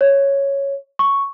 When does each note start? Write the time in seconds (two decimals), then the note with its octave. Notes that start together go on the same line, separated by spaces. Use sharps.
0.01 C#5
0.99 C#6